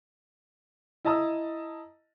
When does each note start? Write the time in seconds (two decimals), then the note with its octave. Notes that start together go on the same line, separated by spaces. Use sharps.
1.05 E4 D#5 A5 A#5 D#6 E6